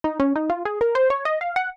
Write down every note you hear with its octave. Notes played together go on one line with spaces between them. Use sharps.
D#4
C#4
D#4
F4
G#4
A#4
C5
C#5
D#5
F5
F#5